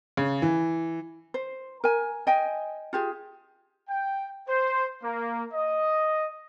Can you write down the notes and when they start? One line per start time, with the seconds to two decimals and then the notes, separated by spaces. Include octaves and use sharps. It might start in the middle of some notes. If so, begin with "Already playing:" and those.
0.17 C#3
0.42 E3
1.34 C5
1.84 A#4 G#5
2.27 D#5 G5 G#5
2.93 F4 G4 G#4
3.88 G5
4.47 C5
5.03 A#3
5.53 D#5